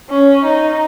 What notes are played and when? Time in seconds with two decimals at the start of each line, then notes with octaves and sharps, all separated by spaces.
0.10 C#4
0.45 D#4